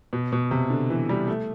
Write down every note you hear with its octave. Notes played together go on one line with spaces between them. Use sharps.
B2
B2
C3
D3
E3
G3
A3